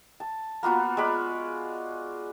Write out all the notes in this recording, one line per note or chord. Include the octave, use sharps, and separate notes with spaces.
A5
A#3 B3 F4 F#4
G#3 D5 B5